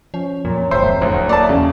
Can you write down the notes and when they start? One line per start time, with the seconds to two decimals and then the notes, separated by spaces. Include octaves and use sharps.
0.14 F3 C#4
0.45 F2 A#2 F#3 A#5
0.71 D1 G#1 F2 C5 E5
1.02 D#1 D2 A3 E4 F#4
1.29 A#3 D5 E5 A5
1.49 E2 C#3